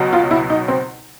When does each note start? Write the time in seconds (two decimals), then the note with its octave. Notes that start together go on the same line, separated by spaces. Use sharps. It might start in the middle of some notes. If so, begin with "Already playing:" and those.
Already playing: C#2 B2 F#3
0.13 F4
0.31 E4
0.50 D#4
0.68 C4